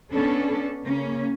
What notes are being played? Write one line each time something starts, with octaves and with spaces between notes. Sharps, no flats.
B3 C#4 D4 A4
C#3 A#3 C#4